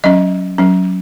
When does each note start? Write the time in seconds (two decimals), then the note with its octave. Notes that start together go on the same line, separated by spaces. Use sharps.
0.04 F#3 C#4 D#5
0.58 F#3 C#4